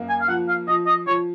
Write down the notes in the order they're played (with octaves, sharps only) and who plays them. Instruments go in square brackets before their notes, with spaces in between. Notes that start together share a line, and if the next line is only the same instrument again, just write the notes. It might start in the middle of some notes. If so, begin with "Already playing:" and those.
Already playing: [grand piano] F#2 A#3
[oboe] G#5
F5
[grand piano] F3 [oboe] F#5
[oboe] F5
[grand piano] F3 [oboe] D#5
[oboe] D#5
[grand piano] F3 [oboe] C#5